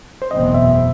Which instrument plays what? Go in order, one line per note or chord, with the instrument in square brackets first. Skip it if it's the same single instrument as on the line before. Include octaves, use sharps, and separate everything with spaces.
[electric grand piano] C5
[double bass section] F#1 E2 B2 A3 C4 [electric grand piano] D#5
[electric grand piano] E5